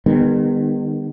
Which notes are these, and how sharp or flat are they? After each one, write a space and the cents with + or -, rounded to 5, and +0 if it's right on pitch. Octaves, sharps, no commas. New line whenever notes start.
D#3 -35 G3 +40 B3 +0